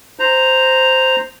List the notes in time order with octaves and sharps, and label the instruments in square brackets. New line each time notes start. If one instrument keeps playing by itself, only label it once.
[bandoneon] C5 A#5